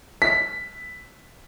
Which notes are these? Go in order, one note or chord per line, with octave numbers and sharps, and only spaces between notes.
B6